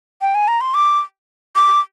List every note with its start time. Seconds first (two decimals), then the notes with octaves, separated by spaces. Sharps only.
0.21 G5
0.35 G#5
0.48 A#5
0.61 C6
0.74 D6
1.55 D6